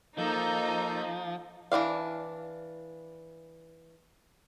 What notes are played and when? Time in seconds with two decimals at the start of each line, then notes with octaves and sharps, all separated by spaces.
0.18 F3 A#3 D#4 A4 G6
1.72 E3 F3 D4 F5